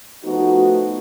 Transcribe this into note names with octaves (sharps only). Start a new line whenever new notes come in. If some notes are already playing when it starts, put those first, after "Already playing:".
F3 A3 B3 D#4 F#4